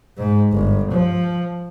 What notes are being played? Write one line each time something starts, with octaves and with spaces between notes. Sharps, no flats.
G#2
G1
F3